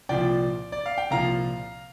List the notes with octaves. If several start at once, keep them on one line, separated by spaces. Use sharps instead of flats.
C2 A#2 F3 D5 G5
D5
F5
G5
C2 A#2 F3 F5 A#5